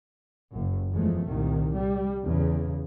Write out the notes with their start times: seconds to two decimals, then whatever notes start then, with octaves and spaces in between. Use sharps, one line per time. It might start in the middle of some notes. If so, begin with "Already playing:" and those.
0.51 F#1 F#2
0.91 E2 F3 G#3 A3
1.26 C2 A#2 D#3
1.75 G3
2.26 E2 C#3